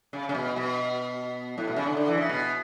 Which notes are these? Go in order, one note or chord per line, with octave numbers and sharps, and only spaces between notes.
C#3
C#3
B2
B2
A2
B2
C#3
D3
D3
E3
C#3
B2